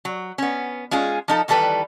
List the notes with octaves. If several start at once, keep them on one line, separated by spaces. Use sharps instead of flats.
F#3
B3 C#4
G#3 C#4 F4 G#4
F3 D#4 A4
D#3 E3 G3 A4 B4